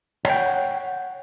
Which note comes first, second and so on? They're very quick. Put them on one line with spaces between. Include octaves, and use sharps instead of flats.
C#5 G5 F#5